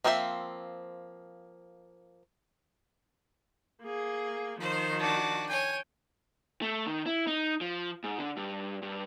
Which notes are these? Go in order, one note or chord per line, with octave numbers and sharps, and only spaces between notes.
F3 A#3 C4 D4 E5
A#3 G#4
D#3 F3 C5
D4 F#4
C#5 G5 G#5
A3
D#3
E4
D#4
F3
G#2
D3
G2
G2